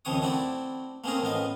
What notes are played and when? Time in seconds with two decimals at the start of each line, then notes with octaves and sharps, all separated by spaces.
0.05 D#2 C#3 F3 C4 C#5 D#6
0.22 A3 C4 E4 F#4 D5
1.04 A3 A#3 C4 C#4 G#4 A#4
1.22 A1 A2 B3 F4 D#5